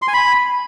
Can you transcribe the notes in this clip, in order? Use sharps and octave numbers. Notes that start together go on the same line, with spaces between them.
C6
G#5
B5